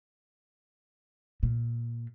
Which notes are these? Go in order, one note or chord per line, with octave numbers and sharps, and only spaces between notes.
A#2